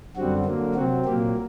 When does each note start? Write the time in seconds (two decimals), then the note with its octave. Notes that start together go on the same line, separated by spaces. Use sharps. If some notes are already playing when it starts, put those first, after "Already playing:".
0.16 F#2 D3 G3 C4 F#4
0.45 D3 F#3 A#3
0.75 C3 F#3 C4 F#4
1.05 A#2 F#3 A#3 G4